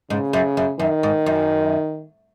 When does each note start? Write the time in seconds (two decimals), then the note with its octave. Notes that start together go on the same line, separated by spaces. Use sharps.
0.10 G#2 C#3
0.33 F#2
0.57 F#2
0.80 F#2 D#3
1.03 G#2
1.26 F#2